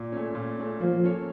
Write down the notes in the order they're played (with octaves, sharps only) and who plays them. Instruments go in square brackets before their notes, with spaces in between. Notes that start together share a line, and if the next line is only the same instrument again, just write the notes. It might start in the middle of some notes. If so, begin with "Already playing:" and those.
Already playing: [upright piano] A#2
A3 C#4
A#2
A3 C#4
[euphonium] F3 [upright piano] A#3
[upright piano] C#4 A4 C#5